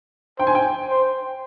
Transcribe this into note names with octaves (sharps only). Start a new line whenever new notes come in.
C5 G5
G#5
G5
C5